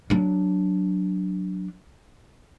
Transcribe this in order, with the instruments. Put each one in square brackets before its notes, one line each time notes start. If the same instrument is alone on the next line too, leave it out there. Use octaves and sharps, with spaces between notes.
[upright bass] F#3 D4